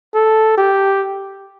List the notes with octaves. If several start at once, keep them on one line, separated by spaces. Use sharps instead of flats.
A4
G4